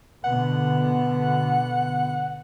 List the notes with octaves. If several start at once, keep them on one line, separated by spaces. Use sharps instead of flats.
B2 D3 B3 F#5